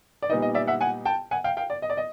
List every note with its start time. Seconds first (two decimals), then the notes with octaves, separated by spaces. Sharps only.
0.23 D5
0.30 A#2 G3 B3 D#4 D#5
0.42 D#5
0.55 D5 E5
0.67 E5 F#5
0.81 F#5 G#5
1.05 G5 A5
1.31 F#5 G#5
1.44 F5 G5
1.57 F5 G5
1.70 D5
1.82 D#5
1.90 D5
1.97 D#5